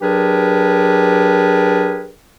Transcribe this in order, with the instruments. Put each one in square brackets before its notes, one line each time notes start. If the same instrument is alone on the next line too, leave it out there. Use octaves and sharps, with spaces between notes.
[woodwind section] F#3 D4 G4 G#4 A#4 B4